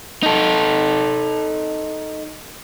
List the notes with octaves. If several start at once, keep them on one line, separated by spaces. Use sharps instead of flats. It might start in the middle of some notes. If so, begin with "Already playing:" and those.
D#4 A4